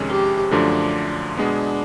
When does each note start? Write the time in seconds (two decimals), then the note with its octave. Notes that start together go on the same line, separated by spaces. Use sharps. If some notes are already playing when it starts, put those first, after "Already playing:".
Already playing: F2 C3 D#3 G#3 C#4
0.09 G4
0.51 F#2 D3 F3 A3 D4
1.37 B2 G#3 B3 D4